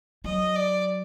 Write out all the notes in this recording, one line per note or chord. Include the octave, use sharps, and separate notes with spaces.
F#3 D#5
D5